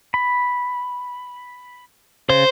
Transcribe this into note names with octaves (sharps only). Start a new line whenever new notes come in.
B5
C#3 C5